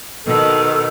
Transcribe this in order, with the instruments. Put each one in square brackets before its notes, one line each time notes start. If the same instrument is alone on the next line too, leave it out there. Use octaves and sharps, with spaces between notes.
[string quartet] B2 D#3 [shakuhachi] A4